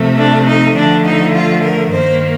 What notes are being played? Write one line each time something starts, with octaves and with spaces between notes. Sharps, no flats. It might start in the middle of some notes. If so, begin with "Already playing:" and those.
Already playing: C3 F3 A3
D4
D#4
D3 F3 A3 D4
D#4
F4
A#4
G2 D#3 A#3 C5